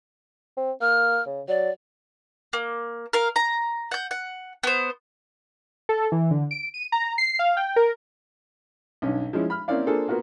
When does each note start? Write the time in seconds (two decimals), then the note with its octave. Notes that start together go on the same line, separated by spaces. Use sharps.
0.57 C4
0.81 A#3 F6
1.26 C#3
1.48 F#3 D5
2.53 A#3
3.13 A#4 F5
3.36 A#5
3.91 F#5 G6
4.11 F#5
4.63 B3 C5
5.89 A4
6.12 E3
6.31 D3
6.51 D7
6.74 D#7
6.92 A#5
7.18 C7
7.39 F5
7.57 G5
7.76 A#4
9.02 B1 G2 C#4
9.33 F3 G#3 C#4 E4
9.50 B5 F6
9.68 A#3 C4 C#4 E4 D5 F5
9.87 A#3 D4 F4 G#4 A4 C5
10.08 A#3 B3 F4 F#4 A#4